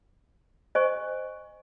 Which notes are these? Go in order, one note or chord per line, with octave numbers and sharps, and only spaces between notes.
C5 D#5 G#5 C#6